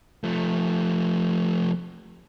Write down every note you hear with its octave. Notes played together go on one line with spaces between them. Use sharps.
F3 A3